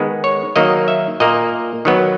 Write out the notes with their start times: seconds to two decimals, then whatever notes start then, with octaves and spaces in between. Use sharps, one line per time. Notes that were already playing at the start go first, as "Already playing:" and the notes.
Already playing: D#3 G#3 B3
0.24 C#5
0.56 D#3 F#3 A#3 D#5
0.88 E5
1.20 A#2 A#3 D#5
1.85 D#3 F#3 B3